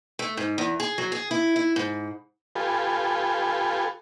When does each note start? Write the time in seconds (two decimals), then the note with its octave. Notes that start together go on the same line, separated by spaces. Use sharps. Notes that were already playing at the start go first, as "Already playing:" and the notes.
0.19 A3
0.37 G#2
0.58 E2
0.80 G#4
0.98 F#3
1.12 G#4
1.31 E4
1.56 E4
1.76 G#2
2.56 F4 G4 A4 B4 G#5